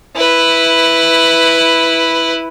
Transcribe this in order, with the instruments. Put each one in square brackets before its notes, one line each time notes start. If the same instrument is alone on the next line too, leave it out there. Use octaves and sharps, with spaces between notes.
[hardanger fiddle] E4 B4